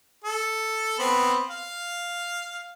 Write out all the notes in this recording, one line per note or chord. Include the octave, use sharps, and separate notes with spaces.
A4
B3 C4 B5
F5